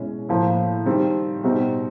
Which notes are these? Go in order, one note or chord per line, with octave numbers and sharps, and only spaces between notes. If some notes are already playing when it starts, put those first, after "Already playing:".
Already playing: B2 G#3 C#4 E4
A2 F3 A#3
D#3 G3 C4
B2 G3 C4 D#4 F#4